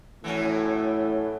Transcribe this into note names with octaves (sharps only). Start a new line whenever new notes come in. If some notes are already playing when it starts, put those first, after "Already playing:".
A2 E3 F#3 C#4